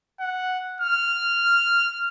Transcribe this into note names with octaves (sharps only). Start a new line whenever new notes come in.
F#5
F6